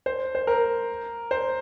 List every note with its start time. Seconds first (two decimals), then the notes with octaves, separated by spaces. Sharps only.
0.06 C5
0.35 C5
0.47 A#4
1.31 C5